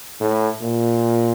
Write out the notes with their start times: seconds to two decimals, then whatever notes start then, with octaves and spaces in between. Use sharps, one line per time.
0.21 A2
0.61 A#2